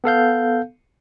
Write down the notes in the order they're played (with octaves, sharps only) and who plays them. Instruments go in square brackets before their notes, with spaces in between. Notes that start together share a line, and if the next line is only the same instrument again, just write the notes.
[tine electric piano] B3 A4 F5 G6